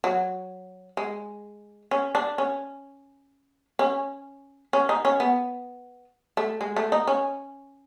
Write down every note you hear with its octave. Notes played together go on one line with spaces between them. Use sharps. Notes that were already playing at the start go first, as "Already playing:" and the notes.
F#3
G#3
C#4
D4
C#4
C#4
C#4
D#4
C#4
B3
A3
G#3
A3
D#4
C#4